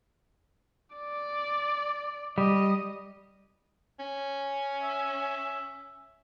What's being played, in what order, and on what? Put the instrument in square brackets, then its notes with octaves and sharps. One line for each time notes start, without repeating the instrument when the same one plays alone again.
[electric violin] D5
[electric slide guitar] G3 [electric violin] D#5
[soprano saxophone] C#4
[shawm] E5